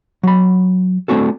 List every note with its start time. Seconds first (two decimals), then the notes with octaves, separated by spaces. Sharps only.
0.23 F#3 B5
1.08 A3 C4 D4 F#4 A4